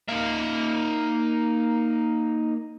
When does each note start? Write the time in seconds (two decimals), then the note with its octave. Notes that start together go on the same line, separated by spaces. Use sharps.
0.08 A#3 D#4 E5 F5